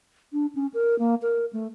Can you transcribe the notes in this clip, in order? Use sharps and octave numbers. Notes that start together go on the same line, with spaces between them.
D4
C#4
A#4
A#3
A#4
A3